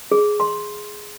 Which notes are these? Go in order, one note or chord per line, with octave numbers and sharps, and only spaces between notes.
G#4
C6